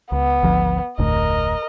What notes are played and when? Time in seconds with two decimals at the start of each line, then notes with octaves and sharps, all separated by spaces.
0.12 C#2 B3
0.43 G#1 D2 F3
0.99 F1 D2 A2 A#4 D#5